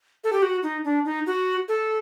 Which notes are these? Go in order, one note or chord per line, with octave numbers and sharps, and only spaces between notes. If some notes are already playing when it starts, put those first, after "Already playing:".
A4
G4
F#4
D#4
D4
D#4
F#4
A4